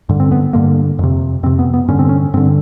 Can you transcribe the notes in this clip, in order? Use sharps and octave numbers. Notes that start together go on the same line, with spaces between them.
G2 D3
C4
B3
G2 D3 A#3
F2 C3
F2 C3 C4
B3
B3
G2 D3 C#4
C4
C#4
G2 D3 C4